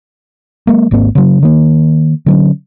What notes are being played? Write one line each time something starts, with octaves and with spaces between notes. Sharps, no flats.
F#3 G#3 A#3
G#1 G#2 A#3 C4
C#3 F#3
D#3 A#3
D3 F#3 C#4